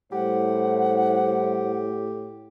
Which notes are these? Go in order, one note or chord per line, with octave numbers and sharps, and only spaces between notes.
A2 G3 E4 G4 C5 F#5